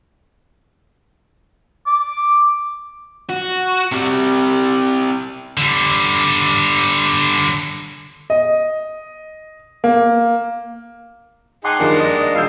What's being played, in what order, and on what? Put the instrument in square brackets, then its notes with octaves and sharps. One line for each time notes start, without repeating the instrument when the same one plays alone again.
[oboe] D6
[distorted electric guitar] F#4
[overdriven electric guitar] C3 G3
[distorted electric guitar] D3 G3
[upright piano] D#5
A#3
[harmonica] D#4 G#4 [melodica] F#5 C6 [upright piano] G5 A5 D6
[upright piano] G2 D#3 F3 [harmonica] G#3 A#3 D4
[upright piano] D5 [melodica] D#5
[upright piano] E1 E6 G6 [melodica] F5